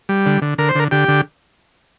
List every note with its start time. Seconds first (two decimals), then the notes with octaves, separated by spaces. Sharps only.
0.09 G3
0.26 D3
0.42 D3
0.58 D3 A#4
0.69 C5
0.75 D3 A#4
0.91 D3 G4
1.08 D3